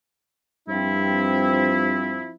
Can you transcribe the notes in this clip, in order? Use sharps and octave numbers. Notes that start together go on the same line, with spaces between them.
G2 F3 C4 E4